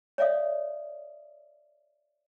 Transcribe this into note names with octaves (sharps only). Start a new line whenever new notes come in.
C#5 D5 E5 F5 D#6